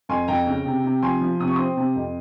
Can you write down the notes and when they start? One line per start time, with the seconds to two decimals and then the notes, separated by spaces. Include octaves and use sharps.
0.09 F2 G#5 C6
0.28 F2 G5 A#5
0.47 C#3
0.66 C3
0.84 C3
1.03 F3 G#5 C6
1.21 F3
1.40 C3 D#6
1.48 C#6
1.56 C4 C6 D#6
1.77 C3
1.96 F2